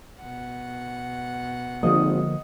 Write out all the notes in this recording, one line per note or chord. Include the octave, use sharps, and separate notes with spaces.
B2 F#5
G#1 D3 F3 A#3 D#5